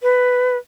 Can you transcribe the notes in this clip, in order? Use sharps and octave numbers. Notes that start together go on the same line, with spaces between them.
B4